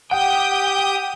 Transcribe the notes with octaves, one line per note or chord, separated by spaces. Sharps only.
G4 F#5 G5 D#6 G6